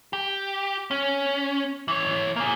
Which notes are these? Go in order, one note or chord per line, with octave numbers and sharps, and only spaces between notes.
G4
C#4
E3 C#5
A#3 G#4